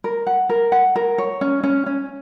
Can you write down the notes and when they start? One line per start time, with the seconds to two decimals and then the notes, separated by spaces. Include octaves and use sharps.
0.04 A#4
0.27 F#5
0.49 A#4
0.72 F#5
0.96 A#4
1.18 C#5
1.41 C#4
1.63 C#4
1.86 C#4